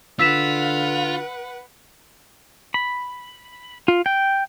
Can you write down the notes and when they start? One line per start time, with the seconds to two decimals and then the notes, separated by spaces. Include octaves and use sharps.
0.19 D3 F4 B4 F#5 E6 B6 E7
2.74 B5
3.88 F4
4.06 G5